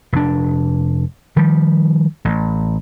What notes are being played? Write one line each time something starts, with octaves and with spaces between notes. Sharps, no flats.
F1 D4
D#3 F3 G3
A1